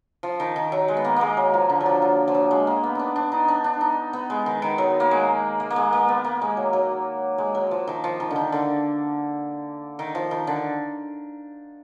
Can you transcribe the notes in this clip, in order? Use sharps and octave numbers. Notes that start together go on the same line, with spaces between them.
F3
D#3
D#3
F#3
G#3
B3
A#3
G#3 A#3
F#3
F3
D3
F#3
F3
F#3
F3
F#3
G#3
A#3
B3
D4 D#4
D4
D#4
D4
D4
D#4
B3
G#3
D#3
D#3
F#3
A#3
G#3
A#3
A#3
G#3
A#3
B3
A#3
G#3
F#3
F#3
G#3
F#3
F3
D#3
F3
D#3
D3
D#3
D3
D#3
F3
D#3
D3